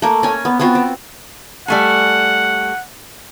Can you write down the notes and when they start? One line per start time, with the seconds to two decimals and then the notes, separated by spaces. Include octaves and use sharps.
0.02 A3 A#3
0.23 C#4 G#5
0.45 B3
0.59 B3 C4 F4 F#4
0.75 C4
1.68 G3 A3 F#5 G#5